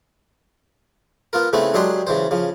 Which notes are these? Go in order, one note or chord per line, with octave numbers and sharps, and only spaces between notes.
B3 F4 A#4
C#3 A3 B3 C4 E4
F#3 G#3 D4 G4 G#4 C6
C#3 E3 C5
C#3 F3